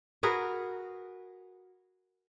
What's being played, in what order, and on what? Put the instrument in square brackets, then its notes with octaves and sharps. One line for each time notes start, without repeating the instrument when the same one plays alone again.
[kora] F#4 G#4 A#4 B4